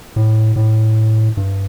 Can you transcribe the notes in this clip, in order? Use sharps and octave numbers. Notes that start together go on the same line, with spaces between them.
A2
A2
G2